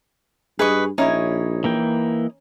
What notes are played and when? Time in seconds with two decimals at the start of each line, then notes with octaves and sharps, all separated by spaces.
0.59 G2 G#4 B4 D#5 C#6
0.98 A#1 C#4 D#4 E4 C#5
1.64 E3 A#3 G5